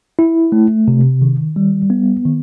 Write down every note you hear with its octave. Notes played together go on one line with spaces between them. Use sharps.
E4
A3
C3
D#3
G3
B3
D#3